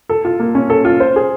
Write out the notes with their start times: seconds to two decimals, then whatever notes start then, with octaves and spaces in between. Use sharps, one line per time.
0.09 A4
0.25 F4
0.40 A#3
0.55 C#4
0.70 A4
0.85 F4
1.00 C5
1.16 G#4